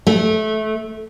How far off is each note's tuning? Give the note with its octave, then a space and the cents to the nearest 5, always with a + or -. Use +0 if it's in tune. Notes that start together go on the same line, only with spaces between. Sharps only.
A3 -20